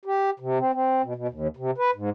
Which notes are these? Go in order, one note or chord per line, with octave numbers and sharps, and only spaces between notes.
G4
C3
C4
C4
B2
B2
D#2
C3
B4
G#2